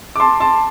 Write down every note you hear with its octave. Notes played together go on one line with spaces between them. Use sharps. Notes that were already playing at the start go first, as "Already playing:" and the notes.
D6
A5 C6
A5 C6